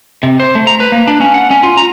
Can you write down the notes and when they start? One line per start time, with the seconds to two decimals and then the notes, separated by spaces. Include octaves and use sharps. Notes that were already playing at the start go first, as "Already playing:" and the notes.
0.23 C3
0.40 C5
0.55 A3
0.67 A#5
0.80 B4
0.92 A#3
1.07 D4
1.20 C#4
1.34 F#5
1.51 C#4
1.63 F4
1.77 A#5